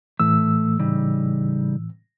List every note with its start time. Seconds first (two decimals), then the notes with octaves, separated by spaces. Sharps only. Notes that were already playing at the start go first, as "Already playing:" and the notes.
0.20 A2 E3 A3 E6
0.79 C#3 G3 D#4